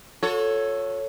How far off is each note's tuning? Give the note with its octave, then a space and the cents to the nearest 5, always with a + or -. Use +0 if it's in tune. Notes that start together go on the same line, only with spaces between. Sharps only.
F#4 -45 A4 +5 C#5 +0